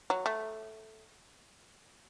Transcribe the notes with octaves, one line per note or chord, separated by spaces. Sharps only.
F#3
A3